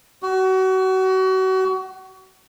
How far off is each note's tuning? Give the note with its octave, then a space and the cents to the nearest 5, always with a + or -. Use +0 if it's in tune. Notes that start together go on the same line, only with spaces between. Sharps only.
F#4 +30